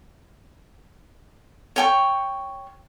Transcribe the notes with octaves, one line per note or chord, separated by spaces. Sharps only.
C#5 G5 C#6